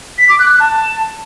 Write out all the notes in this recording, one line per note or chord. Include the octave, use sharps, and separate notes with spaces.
B6
D6
F#6
F#6
A5